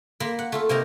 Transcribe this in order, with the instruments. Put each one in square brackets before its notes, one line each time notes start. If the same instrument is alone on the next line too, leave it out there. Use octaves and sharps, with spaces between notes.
[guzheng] A#3 B5 C6
F#5
A3 F4 A4
C3 A#3 C4 D#4 A#4